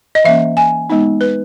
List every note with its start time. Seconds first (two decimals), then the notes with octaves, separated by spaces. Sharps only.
0.15 D#5
0.24 E3 A#3 C#4 E5
0.57 G#5
0.90 G#3 B3 D#4
1.21 B4